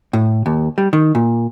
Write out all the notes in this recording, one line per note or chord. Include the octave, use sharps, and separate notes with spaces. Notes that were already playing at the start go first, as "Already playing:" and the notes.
A2
D#2
G3
D#3
A#2